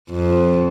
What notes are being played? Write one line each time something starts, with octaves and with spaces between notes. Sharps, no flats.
F2